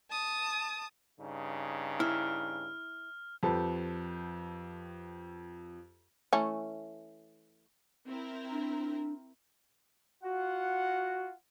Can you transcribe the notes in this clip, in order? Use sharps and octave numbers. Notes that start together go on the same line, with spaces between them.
A5 D#6
G2 C#3 D#4
E4 F6
F2 G4 A4 B4 C5 A5
E3 A3 C#4
C4 E4 A#4
D4
F4 F#4 F#5